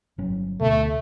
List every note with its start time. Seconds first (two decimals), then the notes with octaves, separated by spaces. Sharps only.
0.18 G1 F#3 C#4
0.61 D2 B2 A3